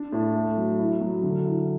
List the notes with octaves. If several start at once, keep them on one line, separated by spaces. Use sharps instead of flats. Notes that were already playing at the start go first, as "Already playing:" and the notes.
Already playing: D4
A2
A3
F#3
E4
F#3
D3
E4